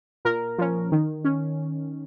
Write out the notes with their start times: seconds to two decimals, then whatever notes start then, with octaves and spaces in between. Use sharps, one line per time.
0.25 A#2 A#4
0.58 F3 C#4
0.92 D#3
1.25 C#4